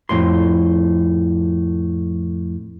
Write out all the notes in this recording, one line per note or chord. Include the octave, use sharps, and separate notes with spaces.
F2 A2 C6